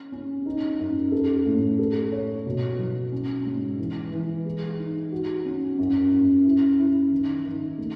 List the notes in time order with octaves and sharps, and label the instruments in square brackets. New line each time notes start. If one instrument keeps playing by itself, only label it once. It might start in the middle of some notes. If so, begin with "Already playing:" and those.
Already playing: [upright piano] C#4
C#4
D#4
F#2
A4
A2
A4
C#5
B2
F#3
C#4
G#2
E3
E3
G#3
D#4
F#4
C#4
F#2
F#2
E4
E4
D#3
D#3
A3